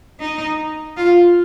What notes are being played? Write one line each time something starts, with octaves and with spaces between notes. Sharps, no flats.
D#4
F4